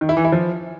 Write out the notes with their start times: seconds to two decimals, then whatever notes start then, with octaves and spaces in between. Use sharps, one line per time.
0.01 D#3
0.09 E4
0.17 E3
0.25 E4
0.32 F3